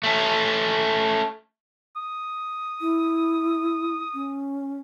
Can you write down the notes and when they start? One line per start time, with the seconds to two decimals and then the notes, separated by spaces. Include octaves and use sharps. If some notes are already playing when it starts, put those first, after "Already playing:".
0.04 A3 C#4
1.96 D#6
2.81 E4
4.14 C#4